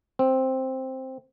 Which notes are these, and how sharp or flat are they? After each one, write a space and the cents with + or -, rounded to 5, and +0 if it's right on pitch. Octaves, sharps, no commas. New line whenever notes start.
C4 +5